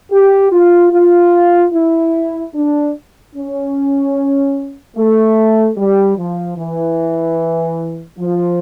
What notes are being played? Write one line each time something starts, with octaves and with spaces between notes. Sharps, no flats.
G4
F4
F4
E4
D4
C#4
A3
G3
F3
E3
F3